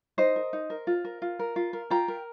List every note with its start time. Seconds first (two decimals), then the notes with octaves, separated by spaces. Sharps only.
0.18 D#4 C5 D#5
0.36 A#4
0.53 D#4
0.70 A#4
0.87 F4
1.05 A#4
1.22 F4
1.39 A#4
1.56 F4
1.73 A#4
1.90 F4 G5 A#5
2.08 A#4